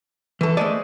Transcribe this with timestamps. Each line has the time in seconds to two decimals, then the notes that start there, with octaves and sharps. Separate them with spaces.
0.41 F#2 E3 A4
0.57 G#3 A3 C5 D5